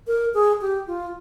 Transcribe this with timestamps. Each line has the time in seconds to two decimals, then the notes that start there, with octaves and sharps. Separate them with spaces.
0.07 A#4
0.34 G#4
0.61 G4
0.87 F4